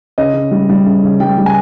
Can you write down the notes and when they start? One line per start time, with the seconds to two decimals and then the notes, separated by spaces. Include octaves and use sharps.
0.18 C#3 D#5
0.34 C#3
0.51 G3
0.69 G3
0.86 C#3
1.04 C#3
1.20 G3 G5
1.38 G3
1.46 G#5